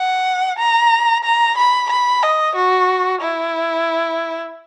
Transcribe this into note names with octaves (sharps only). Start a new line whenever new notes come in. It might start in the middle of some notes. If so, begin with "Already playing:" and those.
Already playing: F#5
A#5
A#5
B5
B5
D#5
F#4
E4